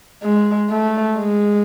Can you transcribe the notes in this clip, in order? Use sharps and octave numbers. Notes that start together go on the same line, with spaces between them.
G#3
A3
G#3